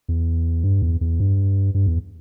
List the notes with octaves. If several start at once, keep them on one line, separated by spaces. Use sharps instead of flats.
E2
G2
E2
E2
G2
G2
E2